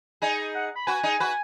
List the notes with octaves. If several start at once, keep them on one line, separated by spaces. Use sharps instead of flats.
D#4 G#4 G#5
F#5
B5
F#4 B4 G#5
D#4 G#4
F#4 B4